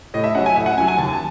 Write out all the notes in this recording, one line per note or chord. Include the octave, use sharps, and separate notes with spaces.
A2 D#5
E5
F#3 C#4 F#5
G#5
A2 E5
F#5
F#3 C#4 G#5
G#5
D#2 A5
A5